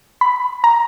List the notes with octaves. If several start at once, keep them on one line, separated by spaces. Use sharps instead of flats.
B5
A#5